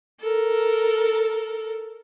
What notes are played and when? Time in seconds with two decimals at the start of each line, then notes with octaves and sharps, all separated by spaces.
0.20 A4 A#4